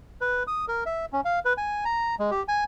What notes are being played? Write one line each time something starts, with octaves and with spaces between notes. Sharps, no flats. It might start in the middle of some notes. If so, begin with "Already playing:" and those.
B4
D#6
A#4
E5
C#4
F5
B4
G#5
A#5
G#3
G4
G#5